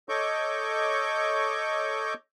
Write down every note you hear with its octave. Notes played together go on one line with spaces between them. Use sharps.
A4 C#5 D#5 C#6 D6 G6